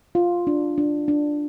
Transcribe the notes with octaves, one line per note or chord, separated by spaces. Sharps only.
F4
D4
D4
D4